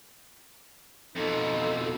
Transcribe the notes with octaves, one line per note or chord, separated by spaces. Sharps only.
F2 B2 D#4 F4 A4